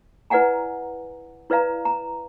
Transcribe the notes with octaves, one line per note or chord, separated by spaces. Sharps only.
E4 B4 D5 F#5 G#5 A#5
E4 B4 D5 F5 A#5
A#5